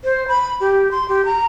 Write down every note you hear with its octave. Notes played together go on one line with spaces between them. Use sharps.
C5
B5
G4
C6
G4
A#5